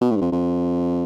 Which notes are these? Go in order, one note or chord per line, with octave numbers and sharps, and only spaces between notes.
B2
A2
G2
F2
F2